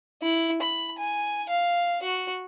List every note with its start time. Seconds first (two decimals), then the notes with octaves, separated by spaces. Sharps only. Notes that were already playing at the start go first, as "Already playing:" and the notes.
0.22 E4
0.62 B5
0.99 G#5
1.49 F5
2.02 F#4